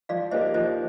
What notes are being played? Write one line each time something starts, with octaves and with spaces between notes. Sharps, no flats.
F3 D5 F5
A#3 D#4 G4 A#4 C5 D#5
F3 C5 D#5